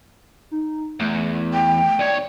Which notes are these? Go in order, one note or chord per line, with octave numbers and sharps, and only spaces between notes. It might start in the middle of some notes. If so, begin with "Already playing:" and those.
D#4
E2 A3
G5
A3
B1 C#5 D5